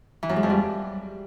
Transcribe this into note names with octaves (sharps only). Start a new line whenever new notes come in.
E3
F#2
G#3
F2
G3